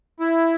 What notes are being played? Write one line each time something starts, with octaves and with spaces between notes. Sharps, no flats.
E4